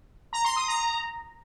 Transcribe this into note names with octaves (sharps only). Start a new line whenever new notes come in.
A#5
C6
D#6
A#5